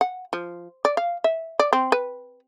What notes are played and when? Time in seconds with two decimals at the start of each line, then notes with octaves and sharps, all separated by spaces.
0.01 F#5
0.33 F3
0.85 D5
0.97 F5
1.24 E5
1.59 D5
1.73 C4
1.92 B4